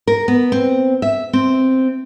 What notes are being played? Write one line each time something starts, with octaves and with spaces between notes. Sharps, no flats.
A#4
B3
C4
E5
C4